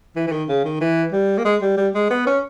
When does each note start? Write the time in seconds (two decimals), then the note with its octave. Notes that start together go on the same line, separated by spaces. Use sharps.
0.16 E3
0.28 E3
0.32 D#3
0.48 C#3
0.65 D#3
0.81 E3
1.13 G3
1.38 A#3
1.45 G#3
1.62 G3
1.77 G3
1.95 G#3
2.11 B3
2.27 C#4